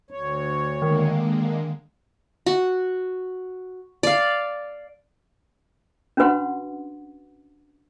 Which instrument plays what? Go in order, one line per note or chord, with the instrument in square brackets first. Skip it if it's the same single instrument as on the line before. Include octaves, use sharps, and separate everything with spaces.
[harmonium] D2 C#5
[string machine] D3 G#3 A#3 [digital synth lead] D#3
[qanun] F#4
D5 F5
[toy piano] C#4 D4 F#4 B4 F#5 C6